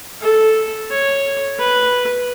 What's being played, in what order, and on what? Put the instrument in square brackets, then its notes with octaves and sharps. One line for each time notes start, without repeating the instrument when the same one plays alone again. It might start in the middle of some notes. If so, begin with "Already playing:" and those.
[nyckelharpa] A4
C#5
B4